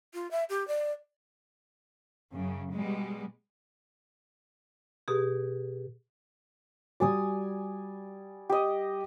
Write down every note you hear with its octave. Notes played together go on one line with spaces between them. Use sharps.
F4
E5
G4
D5
F#2 C#3
B2 G3 G#3
B2 G4 G#4
G3 F#4 D5 G#5 D#6
G4 D#5